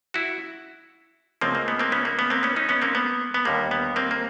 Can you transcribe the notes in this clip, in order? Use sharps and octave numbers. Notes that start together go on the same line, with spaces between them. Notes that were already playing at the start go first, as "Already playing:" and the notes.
E4 F#4
C#2 C#3 F3 A3 A#3 C4
A#3
B3
A#3 C4
B3 C#4
A#3
B3
A#3 C4
B3 C#4
C#4 D#4
B3 C#4
A#3 C4
B3
B3
D#2 D3 G3 A#3
B3
A#3 C4
A#3